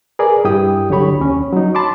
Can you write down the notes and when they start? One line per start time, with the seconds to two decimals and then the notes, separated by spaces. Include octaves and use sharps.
0.19 G#4 A#4 B4 D5 G#5
0.45 G2 E4 G4 G5 D#6
0.89 C2 D3 F#3 G4 C#5 B5
1.19 D#2 C#4
1.53 F#3 D#4
1.75 A5 B5 C6 D6